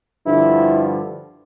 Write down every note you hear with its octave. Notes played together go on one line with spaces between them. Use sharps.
G2 D3 F3 E4